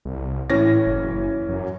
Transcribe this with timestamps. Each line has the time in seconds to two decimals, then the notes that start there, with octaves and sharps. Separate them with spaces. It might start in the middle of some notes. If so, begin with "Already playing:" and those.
0.05 C2
0.50 A2 E3 C#4 A#6
0.86 F#1
1.49 F#2